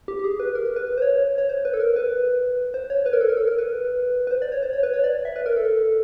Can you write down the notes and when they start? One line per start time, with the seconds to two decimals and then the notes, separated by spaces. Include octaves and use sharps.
0.08 G4
0.19 G4
0.24 G#4
0.40 B4
0.55 A#4
0.65 A#4
0.76 B4
0.87 B4
0.98 C5
1.02 C#5
1.38 C#5
1.49 C5
1.65 B4
1.74 A4
1.80 A#4
1.96 B4
2.74 C5
2.90 C#5
3.06 B4
3.13 A#4
3.21 A4
3.29 A#4
3.37 A4
3.47 A#4
3.58 B4
4.27 B4
4.31 C5
4.42 D5
4.52 C#5
4.63 C5
4.73 C#5
4.83 B4
4.94 C#5
5.04 D5
5.25 E5
5.36 B4
5.46 A#4
5.57 A4